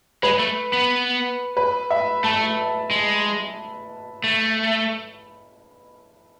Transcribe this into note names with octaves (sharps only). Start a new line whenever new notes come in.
G#3 B4
A3
B3
B4
E5
A3 A5
G#3
A3